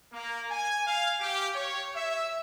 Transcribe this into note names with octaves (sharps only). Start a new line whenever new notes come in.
A#3
G#5
F5
G4
C#5
E5